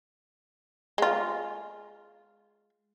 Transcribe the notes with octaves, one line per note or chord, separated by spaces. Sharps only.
G#3 F4